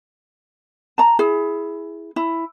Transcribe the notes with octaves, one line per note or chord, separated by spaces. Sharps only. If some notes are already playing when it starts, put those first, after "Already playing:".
A5 A#5
E4 G#4
E4